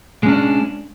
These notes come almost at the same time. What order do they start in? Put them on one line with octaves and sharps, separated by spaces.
G#3 C#4 D4